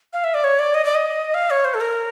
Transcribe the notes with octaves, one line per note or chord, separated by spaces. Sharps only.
F5
E5
D5
C#5
D5
D#5
D5
D#5
F5
C#5
C5
A4
A#4